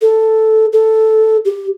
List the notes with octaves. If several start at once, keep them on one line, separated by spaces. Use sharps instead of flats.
A4
A4
G4